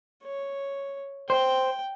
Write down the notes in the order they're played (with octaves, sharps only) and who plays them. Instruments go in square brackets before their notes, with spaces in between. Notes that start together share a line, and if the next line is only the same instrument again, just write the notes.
[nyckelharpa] C#5
[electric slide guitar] C5 [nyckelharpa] G5